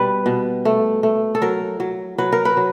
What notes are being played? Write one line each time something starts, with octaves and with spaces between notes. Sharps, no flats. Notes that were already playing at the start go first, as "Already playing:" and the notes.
Already playing: B2 G3 B4
B2
A3
A3
A4
F#3 A#4
F#3
F#3 B4
A#4
B4
F#3